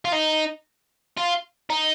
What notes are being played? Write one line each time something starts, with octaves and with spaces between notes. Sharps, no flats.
F4
D#4
F4
D#4